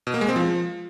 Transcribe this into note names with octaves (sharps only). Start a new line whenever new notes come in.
B2
A#3
G#3
C4
F3